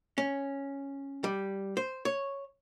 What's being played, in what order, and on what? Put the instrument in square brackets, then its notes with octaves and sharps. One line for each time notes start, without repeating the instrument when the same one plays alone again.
[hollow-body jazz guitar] C#4
G3
C5
C#5